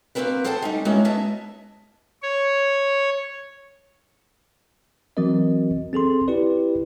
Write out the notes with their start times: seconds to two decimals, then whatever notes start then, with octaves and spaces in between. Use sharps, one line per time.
0.15 A#3 C4 D#4 F#4 A#4 B4
0.44 G#4 A4 C5 F#5 G5 A5
0.62 G3 C#4 D#4
0.85 G3 G#3 A#3 C#4 E4 F#4
1.05 B3 G#4 D#5 E5 A5
2.22 C#5
5.17 E3 F#3 C4 F#4 A#4 D#5
5.93 C4 G#4 A4 C6
6.28 E4 G4 B4 D5